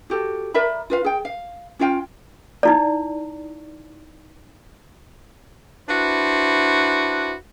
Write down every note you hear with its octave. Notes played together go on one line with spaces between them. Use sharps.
F#4 G4 A4
A#4 D5 E5 B5
F4 B4 F5
G#4 G5
F5
C#4 F4 F5 G5
D#4 E4 D5
D4 E4 F#4 B4 C5